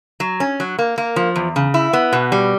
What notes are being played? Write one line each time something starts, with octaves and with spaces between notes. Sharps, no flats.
F#3
C#4
F#3
A#3
A#3
F3
E2
C#3
E4
B3
B2
G3